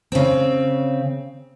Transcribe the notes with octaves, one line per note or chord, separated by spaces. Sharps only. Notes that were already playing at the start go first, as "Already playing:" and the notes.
C#3 C4